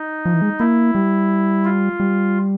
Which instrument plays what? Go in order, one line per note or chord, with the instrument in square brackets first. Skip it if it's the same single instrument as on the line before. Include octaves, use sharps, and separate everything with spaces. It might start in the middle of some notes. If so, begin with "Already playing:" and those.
Already playing: [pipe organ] D#4
[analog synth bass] F3
E3
G#3
[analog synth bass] A#3 [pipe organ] E4
[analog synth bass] G3
[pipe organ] F4
[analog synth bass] G3